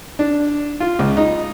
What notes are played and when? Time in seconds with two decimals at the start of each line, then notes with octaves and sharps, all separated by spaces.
0.19 D4
0.80 F4
0.99 C#2
1.17 D#4